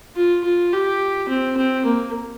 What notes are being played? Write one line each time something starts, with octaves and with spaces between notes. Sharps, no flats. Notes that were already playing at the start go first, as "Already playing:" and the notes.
F4
F4
G4
C4
C4
A#3